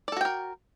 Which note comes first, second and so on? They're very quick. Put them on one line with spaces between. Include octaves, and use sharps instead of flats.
D5 A4 F#4 G5 A#4